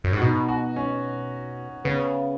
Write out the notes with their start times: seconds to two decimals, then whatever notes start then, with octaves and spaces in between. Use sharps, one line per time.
0.04 F#2
0.13 G#2
0.17 F#4
0.21 B2 D#4
0.48 F#4
0.76 C#4
1.84 C#3 B3